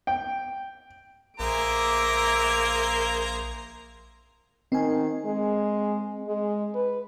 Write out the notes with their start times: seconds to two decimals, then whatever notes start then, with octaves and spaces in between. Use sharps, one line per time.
0.07 G5
1.40 A#1 A#3 G#4 C5 E5 A#5 D6
4.72 D#3 C4 G#5
5.25 G#3
6.27 G#3
6.75 B4